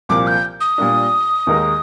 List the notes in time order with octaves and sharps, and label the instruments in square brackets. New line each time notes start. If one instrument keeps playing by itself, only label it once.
[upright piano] C2 A#2 F3 A#3 [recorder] D6
[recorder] G6
D#6
[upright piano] A#2 G3 A#3 D4
D#2 D#3 G#3 D#4 A#4